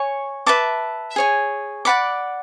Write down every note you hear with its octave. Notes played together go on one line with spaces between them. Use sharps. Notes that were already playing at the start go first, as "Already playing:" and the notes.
Already playing: C#5 G#5 C#6
B4 E5 A5 D6
G#4 C#5 G#5
D5 F#5 B5 D6